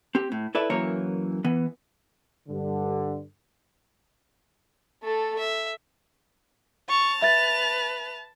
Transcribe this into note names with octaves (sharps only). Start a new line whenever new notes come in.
C4 G4
A2
E4 A4 B4 D5 E5
F#2 E3 A#3 E4 C#5 A#5
E3 B3
G2 D3
A3 A4
E5
A5 C#6 F7
B4 E5 A6